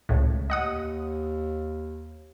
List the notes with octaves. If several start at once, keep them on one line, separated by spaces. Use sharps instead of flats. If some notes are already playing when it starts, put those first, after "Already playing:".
C#2 A2
D#2 D#5 F#5 D#6